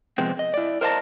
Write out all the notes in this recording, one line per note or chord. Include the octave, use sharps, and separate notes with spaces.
C3 F3 G#3 B3 C4
D#5
E4 D5
A#4 C5 D#5 F5 A5 A#5